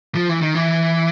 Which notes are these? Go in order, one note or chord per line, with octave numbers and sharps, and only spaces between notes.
F3
E3
D#3
E3